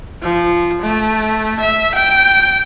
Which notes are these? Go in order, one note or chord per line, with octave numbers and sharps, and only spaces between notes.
F3
A3
E5
G5